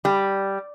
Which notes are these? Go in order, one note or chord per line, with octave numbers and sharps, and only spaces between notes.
G3